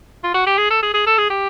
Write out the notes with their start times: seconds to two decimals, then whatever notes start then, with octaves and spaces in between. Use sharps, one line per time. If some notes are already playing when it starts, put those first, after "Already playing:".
0.23 F4
0.34 F#4
0.46 G4
0.58 G#4
0.70 A4
0.82 G#4
0.94 G#4
1.06 A4
1.18 G#4
1.30 G4